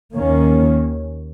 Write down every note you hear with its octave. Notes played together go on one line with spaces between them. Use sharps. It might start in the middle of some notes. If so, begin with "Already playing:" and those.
D#2 D#3 A#3 C#4